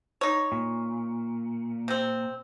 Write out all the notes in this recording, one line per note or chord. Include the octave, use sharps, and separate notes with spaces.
D#4 C#5
A#2
C3 C4